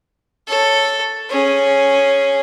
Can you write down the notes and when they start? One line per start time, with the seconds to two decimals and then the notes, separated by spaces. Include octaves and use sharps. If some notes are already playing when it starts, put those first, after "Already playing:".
0.48 A4 C#5
1.30 C#4 G#4